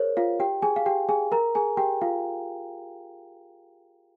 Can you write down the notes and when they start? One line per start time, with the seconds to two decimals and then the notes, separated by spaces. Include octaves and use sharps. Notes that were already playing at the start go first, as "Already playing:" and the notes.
Already playing: G#4 A#4 C5 C#5
0.17 F4 F5
0.40 G4 G5
0.62 G#4 G#5
0.76 F5
0.86 G4 G5
1.09 G#4 G#5
1.32 A#4 A#5
1.55 G#4 G#5
1.77 G4 G5
2.02 F4 F5